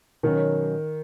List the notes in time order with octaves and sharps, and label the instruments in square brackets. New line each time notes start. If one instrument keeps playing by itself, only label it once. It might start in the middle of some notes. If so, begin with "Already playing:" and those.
[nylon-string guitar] B2 F#3 C#4 [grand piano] D#3